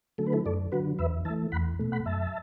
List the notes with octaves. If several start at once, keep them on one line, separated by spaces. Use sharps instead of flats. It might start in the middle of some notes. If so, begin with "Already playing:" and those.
D3 F#3 A3 A4
B4
E4 A4
F#2 A4 D5
D3 F#3 F#4 B4
E2 B4 E5
E3 A3 E5 A5
E2 F#5 B5
B2 A3
F#5 B5
F#2 E5 A5